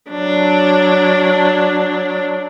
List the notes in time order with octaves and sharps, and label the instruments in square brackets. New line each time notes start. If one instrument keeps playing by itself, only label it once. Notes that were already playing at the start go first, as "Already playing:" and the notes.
[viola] F#3 D4